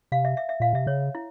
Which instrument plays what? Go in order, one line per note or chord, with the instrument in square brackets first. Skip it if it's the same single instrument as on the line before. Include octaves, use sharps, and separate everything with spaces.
[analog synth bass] C3 [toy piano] F5
[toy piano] E5
E5
E5
[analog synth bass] A#2 [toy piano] F5
[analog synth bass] C3 [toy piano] E5
[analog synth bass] C#3 [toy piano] C#5
[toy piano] E4